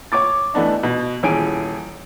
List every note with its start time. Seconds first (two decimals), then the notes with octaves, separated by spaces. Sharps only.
0.12 C#5 C#6 D6 A6
0.54 E3 A3 B3 D4 D#4
0.83 B2
1.23 D#1 E3 C#4 G#4 G#5 D7